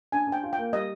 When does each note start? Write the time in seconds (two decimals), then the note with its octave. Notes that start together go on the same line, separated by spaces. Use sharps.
0.12 D4 G#5
0.27 D4
0.32 G5
0.43 F4
0.53 A#3 G5
0.73 G3 D#5